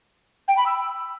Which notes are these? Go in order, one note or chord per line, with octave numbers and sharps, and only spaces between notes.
G5
B5
E6